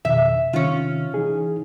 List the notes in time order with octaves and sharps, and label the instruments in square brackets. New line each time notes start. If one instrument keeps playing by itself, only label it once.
[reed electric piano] F2 B2 D#3 [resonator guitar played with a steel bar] E5
[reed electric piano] C3 D#3 [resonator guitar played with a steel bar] C#4 F4
[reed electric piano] E3 D#4 G#4